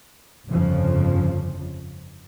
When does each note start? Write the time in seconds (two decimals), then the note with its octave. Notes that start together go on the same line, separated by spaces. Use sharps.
0.48 G1 F2 C#3 F3